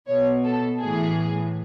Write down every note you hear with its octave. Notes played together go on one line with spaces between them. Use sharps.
B2 C#5
A4
A2 E3 G#4